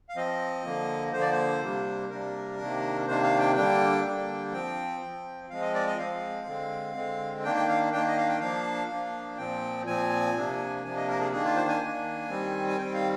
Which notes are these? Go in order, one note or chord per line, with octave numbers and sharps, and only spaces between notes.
F5
F3 C4 D#5
D3 F3 A#3
D3 F3 A#3 C5
D5
C5
C3 G3 A#3 D4
C3 G3 A#3 D4 A#4
C3 D#3 A#3 D4
C3 D#3 A#3 D4 C5
F5
G5
D3 G3 A#3 D4 G5
D3 G3 A#3 D4
F3 C4 G5
F3 C4
F3 G#3 C4 F5
D#5
D5
D#5
F3 G#3 C4 F5
D3 G#3 C4
D3 G#3 C4
D#3 A#3 D4 G5
G5
F5
D#3 A#3 D4 G5
D#5
F5
G5
F3 A#3 D4 F5
F3 A#3 D4
A#2 F3 C4 G5
A#2 F3 C4 G#5
C3 F3 A#3 D4
C3 F3 A#3 D4 G#5
D#5
A#4
G#4
D#3 A#3 D4 G#4
F4
C5
G#5
D#3 A#3 D4
D#3 G3 C4
G#5
D#3 G3 C4 G5
F5